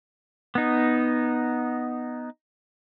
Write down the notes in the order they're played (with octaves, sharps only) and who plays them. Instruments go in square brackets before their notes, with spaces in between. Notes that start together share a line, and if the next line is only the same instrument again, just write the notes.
[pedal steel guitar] B3 D#4